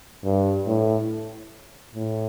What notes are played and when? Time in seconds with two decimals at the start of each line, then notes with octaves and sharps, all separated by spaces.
0.24 G2
0.67 A2
1.95 A2